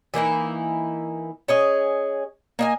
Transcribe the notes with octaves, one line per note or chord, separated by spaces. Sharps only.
E3 A#3 D#4 E4
C#4 G#4 D#5
A#3 D#5 G#5